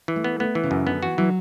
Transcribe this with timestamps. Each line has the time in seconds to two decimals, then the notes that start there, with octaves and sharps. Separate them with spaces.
0.08 E3
0.16 A3
0.24 B3
0.40 A3 B3
0.55 E3
0.63 C#3
0.71 F#2
0.87 D3 B3
1.02 E3 F#4
1.18 E3 F#3